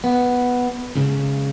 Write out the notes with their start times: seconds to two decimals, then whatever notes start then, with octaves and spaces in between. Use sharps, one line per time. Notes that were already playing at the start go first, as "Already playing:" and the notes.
0.04 B3
0.95 C#2 C#3